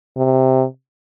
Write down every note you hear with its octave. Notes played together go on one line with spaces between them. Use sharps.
C3